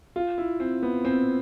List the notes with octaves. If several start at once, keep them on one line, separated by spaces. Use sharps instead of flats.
F4
E4
C4
B3
C4